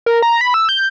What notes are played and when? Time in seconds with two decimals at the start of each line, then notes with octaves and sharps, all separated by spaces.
0.06 A#4
0.22 A#5
0.41 B5
0.54 E6
0.69 G6